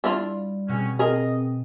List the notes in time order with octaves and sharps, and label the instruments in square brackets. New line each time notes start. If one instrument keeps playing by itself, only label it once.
[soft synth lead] G3 [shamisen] D4 E4 F4
[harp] B2 F#4 [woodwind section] C4 C#4
[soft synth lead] C4 [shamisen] G#4 A#4 [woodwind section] D#5